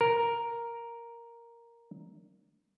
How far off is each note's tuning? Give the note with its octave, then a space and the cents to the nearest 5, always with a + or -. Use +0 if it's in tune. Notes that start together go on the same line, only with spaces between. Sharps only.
A#4 +5